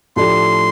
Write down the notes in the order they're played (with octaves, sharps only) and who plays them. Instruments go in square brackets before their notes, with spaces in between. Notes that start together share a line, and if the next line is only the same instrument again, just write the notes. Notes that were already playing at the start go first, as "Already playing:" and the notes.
[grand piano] A2 F3 A3 D4 G4 [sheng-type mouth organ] C6